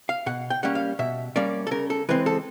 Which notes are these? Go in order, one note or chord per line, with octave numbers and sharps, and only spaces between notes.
F5
B2 F#5
G5
G3 A#3 C#4 F#5
F5
B2 E5
G3 A#3 C#4 D5
A4
C#3 A#4
A4
E3 G#3 C4 B4
A4